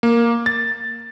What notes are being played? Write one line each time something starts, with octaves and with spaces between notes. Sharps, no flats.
A#3
A6